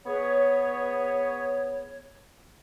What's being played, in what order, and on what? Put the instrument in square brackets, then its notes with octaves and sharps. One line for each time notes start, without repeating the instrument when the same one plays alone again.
[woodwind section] B3 G#4 B4 C#5